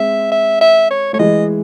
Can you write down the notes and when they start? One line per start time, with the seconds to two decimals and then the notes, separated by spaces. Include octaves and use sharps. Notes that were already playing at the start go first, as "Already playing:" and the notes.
Already playing: G#3 C4 E5
0.32 E5
0.61 E5
0.91 C#5
1.13 A3 C#5
1.19 E3 G#3 D#5